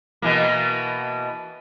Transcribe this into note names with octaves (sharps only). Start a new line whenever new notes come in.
B2 E3 A#3